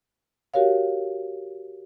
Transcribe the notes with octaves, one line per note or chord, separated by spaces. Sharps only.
F#4 G4 A#4 C#5 F5